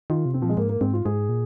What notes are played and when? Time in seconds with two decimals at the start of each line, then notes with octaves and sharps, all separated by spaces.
0.10 D#3 F4
0.25 C3
0.34 C4
0.41 A#2 F3
0.49 G#3
0.57 G#2 A#3
0.69 A#3
0.81 G#2 C4
0.93 F4
1.05 G#2 G#4
1.29 A#2